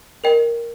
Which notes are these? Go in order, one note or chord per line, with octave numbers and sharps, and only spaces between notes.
A#4 D#5 G5